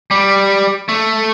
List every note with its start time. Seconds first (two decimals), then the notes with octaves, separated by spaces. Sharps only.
0.11 G3
0.89 A3